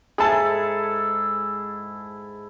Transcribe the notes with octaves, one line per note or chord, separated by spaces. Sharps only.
G#2 E4 G#4 A4 A5